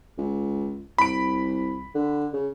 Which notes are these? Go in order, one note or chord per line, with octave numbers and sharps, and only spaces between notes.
C#2
C2 B5 D7
D3
C#3